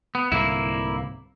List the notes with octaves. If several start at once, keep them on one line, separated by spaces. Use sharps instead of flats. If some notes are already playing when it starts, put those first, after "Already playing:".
B3
C2 G#2 D3 A#3 E4